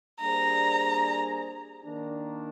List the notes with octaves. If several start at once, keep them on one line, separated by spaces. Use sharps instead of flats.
G3 A#3 D4 G#4 C5 A#5
D#3 A#3 D4